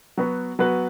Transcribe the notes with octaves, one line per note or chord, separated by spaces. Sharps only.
F#3 B3 F#4 B4
F#3 B3 F#4 B4